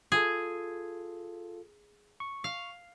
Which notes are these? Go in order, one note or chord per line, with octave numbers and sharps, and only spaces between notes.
F4 G#4 A4
C#6
F5